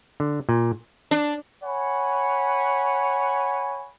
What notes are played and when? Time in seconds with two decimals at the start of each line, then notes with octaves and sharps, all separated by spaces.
0.20 D3
0.49 A#2
1.11 D4
1.64 C#5 F#5 G#5 B5